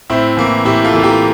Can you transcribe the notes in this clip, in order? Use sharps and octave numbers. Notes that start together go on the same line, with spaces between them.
A2 C4 E4
E3 A#3
A2 E4 G4
F4 A4
E3 A#3
G4 A#4